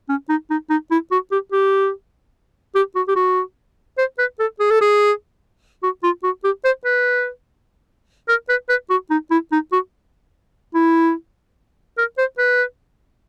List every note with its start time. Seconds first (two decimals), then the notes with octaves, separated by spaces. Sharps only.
0.09 C#4
0.29 D#4
0.50 D#4
0.70 D#4
0.91 E4
1.11 F#4
1.32 G4
1.52 G4
2.75 G4
2.96 F#4
3.08 G4
3.16 F#4
3.98 C5
4.19 B4
4.40 A4
4.60 G#4
4.71 A4
4.81 G#4
5.83 F#4
6.03 F4
6.24 F#4
6.44 G4
6.65 C5
6.85 B4
8.28 A#4
8.49 B4
8.69 B4
8.90 F#4
9.10 D#4
9.31 E4
9.52 D#4
9.72 F#4
10.75 E4
11.98 A#4
12.18 C5
12.38 B4